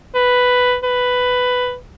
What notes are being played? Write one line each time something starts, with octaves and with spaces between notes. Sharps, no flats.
B4
B4